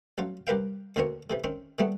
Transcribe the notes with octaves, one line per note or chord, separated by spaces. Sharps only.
A1 F#3 F4
C2 G4 A#4 B4 F5 G5
D2 B2 A#3 C4 A#4 C#5
A2 C3 E3
D#3 C4 C#4
A#2 G3 A3 B3